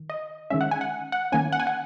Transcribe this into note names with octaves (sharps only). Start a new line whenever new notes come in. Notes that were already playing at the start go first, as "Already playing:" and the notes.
Already playing: D#3
D#5
D#3 G#3 C#4 E5
F#5
G#5
F#5
F#5
D#3 A#3 C#4 G#5
F#5
G#5
F#5